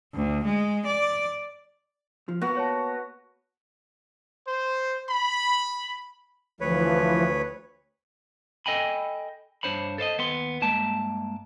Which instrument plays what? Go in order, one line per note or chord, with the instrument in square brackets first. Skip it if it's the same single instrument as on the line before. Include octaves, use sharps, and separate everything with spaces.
[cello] D2
G#3
D5
[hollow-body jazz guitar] F3
[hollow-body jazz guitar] A#3 B3 [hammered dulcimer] F#4
[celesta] C#5 A5
[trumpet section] C5
B5
[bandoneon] D2 B4 C#5 [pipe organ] E3 F3
[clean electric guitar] A4 D#5 G5 G#5 B5
G2 D#3 D4 C5 C#5 B5
A4 C5 D5 D#5
D#2 B3 C6
G2 G#3 A#3 A5